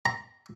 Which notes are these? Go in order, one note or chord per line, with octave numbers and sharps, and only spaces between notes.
A#5